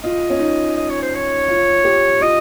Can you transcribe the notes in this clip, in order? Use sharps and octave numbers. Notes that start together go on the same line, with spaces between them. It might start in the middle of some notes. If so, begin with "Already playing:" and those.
F4 D#5
C#4
D#4
D#5
C#5
C5
C#5
F4
G4
F4 D#5